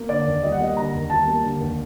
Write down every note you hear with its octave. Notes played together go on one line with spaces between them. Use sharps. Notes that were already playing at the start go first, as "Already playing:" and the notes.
Already playing: A#3
D3 D5
D#2
G3 D#5
F#5
A#3 D#5
D3 A#5
D#2
G3 A5
A#3
D3
D#2